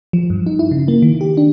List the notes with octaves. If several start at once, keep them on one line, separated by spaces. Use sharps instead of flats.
F3
G2
D#4
E4
C#3
A#3
D#3
G4
D4